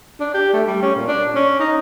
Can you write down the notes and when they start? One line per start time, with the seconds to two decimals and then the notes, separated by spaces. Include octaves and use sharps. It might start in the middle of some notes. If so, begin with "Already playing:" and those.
0.20 D4
0.34 G4
0.53 A3
0.67 G3
0.82 C#4
0.96 A#2
1.08 D4
1.35 C#4
1.60 D#4